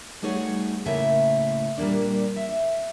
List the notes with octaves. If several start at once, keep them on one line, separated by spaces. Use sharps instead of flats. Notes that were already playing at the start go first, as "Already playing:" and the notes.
G3 A3 D#4 F#4 G#4 C#5
A2 C#3 A3 A#3 E5
A#2 G3 A#3 D4
E5